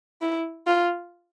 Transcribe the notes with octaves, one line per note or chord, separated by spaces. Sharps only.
E4
F4